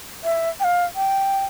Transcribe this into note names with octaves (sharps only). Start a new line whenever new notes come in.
E5
G5
F5
G5